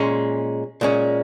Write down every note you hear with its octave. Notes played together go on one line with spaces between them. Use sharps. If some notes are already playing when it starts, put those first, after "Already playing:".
Already playing: A#2 G#3 C#4
A#2 G#3 C#4